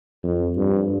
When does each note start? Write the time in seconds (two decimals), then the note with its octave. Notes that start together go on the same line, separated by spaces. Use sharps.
0.23 F2
0.57 G2